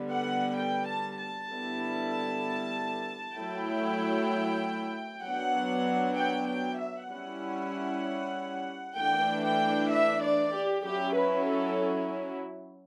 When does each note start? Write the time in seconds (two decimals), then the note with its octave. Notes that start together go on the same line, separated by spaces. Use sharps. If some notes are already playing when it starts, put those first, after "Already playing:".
Already playing: D3 G3 B3
0.10 F#5
0.56 G5
0.87 A5
1.18 A5
1.49 D3 G3 B3 E4
3.36 F#3 A3 E4 G5
5.23 F#3 B3 D4 F#5
6.16 G5
6.48 G5
6.79 E5
7.09 G3 C#4 E4 F#5
8.96 E3 A3 D4 G5
9.43 G5
9.90 E5
10.21 D5
10.53 G4
10.83 F#3 C#4 E4 G4
11.15 B4
11.45 A4